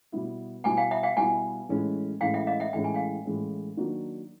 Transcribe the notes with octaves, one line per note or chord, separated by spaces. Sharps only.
B2 G3 B3 E4
B2 G3 B3 E4 F#5 G#5
F5 G5
E5 F#5
F5 G5
B2 G3 B3 E4 F#5 G#5
A2 E3 G#3 C#4
A2 E3 G#3 C#4 F5 G5
E5 F#5
D#5 F5
E5 F#5
A2 E3 G#3 C#4 G5
G#5
F5 G5
A2 E3 G#3 C#4
D#3 F#3 A#3 D4 F#4